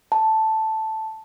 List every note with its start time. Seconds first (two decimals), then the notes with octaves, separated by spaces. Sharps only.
0.12 A5